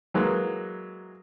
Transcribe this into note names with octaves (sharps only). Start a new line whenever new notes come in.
E3 F#3 G#3 A#3